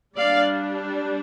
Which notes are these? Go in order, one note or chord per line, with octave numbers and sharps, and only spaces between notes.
G3 D4 D5 F5